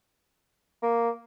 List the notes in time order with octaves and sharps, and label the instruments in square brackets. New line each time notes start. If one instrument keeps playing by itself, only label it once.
[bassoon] A#3